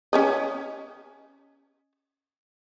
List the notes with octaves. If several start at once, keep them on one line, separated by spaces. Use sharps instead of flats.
C#4 C#5 D#5